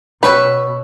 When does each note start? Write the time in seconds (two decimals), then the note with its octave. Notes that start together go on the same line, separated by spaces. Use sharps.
0.23 B2 C#4 B4 C#5 B5 C#6 E6